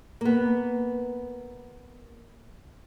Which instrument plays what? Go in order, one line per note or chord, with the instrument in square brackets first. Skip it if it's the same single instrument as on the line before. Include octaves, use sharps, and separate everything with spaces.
[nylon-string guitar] A#3 B3